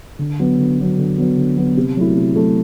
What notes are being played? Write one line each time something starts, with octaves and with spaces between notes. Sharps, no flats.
D3
F#3 B3
D3
F#3 B3
D3
F#3 B3
D3
F#3 B3
C3
F#3 A3 E4
C3
F#3 A3 E4